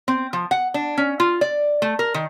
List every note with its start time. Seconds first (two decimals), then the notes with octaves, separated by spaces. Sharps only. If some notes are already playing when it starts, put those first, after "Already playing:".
0.08 C4
0.33 F3
0.51 F#5
0.74 D4
0.98 C#4
1.20 F4
1.41 D5
1.82 A3
1.99 A#4
2.14 D#3